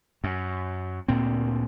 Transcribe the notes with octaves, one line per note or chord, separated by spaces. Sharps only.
F#2
D2 A#2 C4